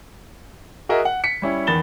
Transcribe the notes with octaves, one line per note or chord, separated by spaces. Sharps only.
F#4 G#4 A#4 D#5 E5
F#5
B6 C#7
G3 C#4 E4
E2 D#3 B5 A6 E7 G7